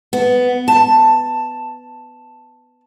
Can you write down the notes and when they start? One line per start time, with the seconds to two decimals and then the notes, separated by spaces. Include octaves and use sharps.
0.13 B3
0.68 A5